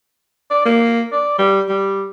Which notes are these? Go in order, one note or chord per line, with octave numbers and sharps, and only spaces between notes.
D5
A#3
D5
G3
G3